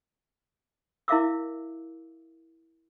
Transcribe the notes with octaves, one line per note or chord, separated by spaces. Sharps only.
E4 A#4 E5 F5 D6 E6